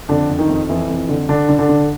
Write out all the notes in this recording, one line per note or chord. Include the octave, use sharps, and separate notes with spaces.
F2 D3 D4
F2
D#3 D#4
F2
F2 E3 E4
F2
D3
D3 D4
D3
D3 D4
D3